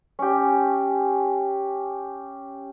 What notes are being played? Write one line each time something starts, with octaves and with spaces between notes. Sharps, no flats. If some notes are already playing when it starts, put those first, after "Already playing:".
C#4 G4